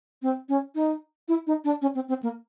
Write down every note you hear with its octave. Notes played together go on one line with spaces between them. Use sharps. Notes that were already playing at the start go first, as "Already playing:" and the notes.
C4
C#4
D#4
E4
D#4
D4
C#4
C4
C4
A#3